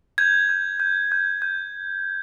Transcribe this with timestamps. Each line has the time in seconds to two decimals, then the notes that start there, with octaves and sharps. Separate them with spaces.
0.18 G6 G#6
0.49 G6
0.80 G6
1.12 G6
1.42 G6